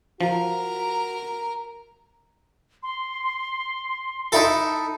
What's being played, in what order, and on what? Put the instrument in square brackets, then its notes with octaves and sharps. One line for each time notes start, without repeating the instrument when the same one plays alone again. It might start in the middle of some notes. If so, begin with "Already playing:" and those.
[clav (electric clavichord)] F3 [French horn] F#4 [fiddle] A#4 A#5
[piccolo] C6
[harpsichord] D#4 E4 A4